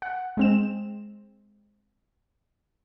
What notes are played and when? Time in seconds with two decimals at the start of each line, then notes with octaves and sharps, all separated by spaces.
0.02 F#5
0.37 G#3 C4 E7